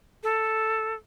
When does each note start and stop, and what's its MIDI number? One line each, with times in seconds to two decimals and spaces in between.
0.23 0.94 69